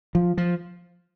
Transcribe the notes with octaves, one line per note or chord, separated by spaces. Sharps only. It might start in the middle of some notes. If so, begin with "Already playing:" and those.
F3
F3